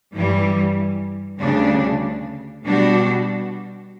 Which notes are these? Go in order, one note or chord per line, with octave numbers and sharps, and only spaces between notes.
G2 E3 G3
D2 C#3 G3 D4
B2 G3 D4 F#4